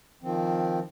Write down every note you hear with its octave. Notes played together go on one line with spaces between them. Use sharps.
D#3 F3 C4